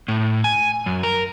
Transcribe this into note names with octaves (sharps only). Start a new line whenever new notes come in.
A2
G#5
F#2
A#4